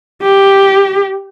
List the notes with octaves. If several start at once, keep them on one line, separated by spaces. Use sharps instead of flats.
G4